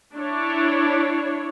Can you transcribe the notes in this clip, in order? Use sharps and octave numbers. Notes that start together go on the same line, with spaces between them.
D4 E4 C#5